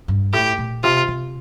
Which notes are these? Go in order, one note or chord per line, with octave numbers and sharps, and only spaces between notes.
G2
A2 G4
A#2
C3 F4
C3